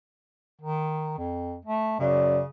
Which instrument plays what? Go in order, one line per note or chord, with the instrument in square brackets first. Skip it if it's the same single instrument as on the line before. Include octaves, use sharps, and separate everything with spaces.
[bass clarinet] D#3
F2
A3
[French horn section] F#2 D5 [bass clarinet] C#3